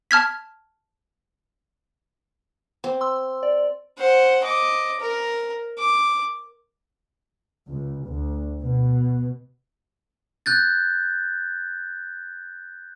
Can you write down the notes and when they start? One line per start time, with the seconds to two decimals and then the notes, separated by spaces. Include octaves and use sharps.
0.11 A5 F6 G#6 B6
2.84 C4
3.01 C6 E6
3.43 D5
3.98 C5 F#5
4.44 D#5 D6
5.01 A#4
5.79 D6
7.69 C#2
8.08 D2
8.62 B2
10.46 F#6 G6 A6